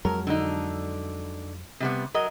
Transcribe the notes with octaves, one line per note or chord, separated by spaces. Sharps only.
F2 F#3 G#3 A#4
D3 D#4
C3 G3 B3
F#3 A#4 D#5